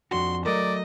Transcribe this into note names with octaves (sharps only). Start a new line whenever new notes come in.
F2 D4 F#4 C6
F#3 A3 A#4 D5 D#5